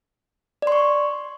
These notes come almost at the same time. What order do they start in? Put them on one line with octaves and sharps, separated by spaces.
D5 C6 C#6